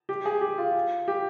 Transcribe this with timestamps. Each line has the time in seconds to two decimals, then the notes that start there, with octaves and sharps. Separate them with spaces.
0.09 G4
0.25 G#4
0.41 G4
0.58 F4
1.08 G4